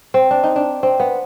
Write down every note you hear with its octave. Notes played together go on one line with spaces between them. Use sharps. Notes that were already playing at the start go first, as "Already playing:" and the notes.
C4
D4
D#4
D4
C4
B3